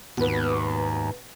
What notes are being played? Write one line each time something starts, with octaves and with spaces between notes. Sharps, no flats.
D#2 G#2 B2 B4